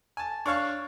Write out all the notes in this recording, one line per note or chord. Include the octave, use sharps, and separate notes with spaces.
G#5 A5
D4 C#5 F5 C#6